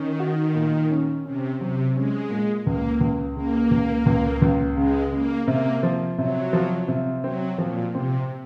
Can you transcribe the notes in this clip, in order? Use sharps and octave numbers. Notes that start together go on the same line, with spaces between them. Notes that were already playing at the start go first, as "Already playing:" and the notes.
Already playing: D#3 C#4
F#4
A#2
C#4
C3 C#4
C3 F#3
G#3 C#4
A#2
C#2 A#3
C#2
C#3 A#3
C#2
C#2
C#2
C#3 G#3
C#3 A#3
C3 A#3
F3
C3 F#3
F3
C3
F#3 C4
A#2 F3
C3 C4